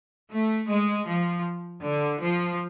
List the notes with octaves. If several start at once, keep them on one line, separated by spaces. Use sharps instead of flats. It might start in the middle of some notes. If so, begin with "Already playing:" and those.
A3
G#3
F3
D3
F3